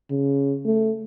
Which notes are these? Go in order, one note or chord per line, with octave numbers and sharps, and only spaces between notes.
C#3
A3